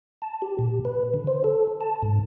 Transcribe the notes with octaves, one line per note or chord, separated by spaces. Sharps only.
A5
G4
A#2
B4
D3
C5
A4
A5
G#2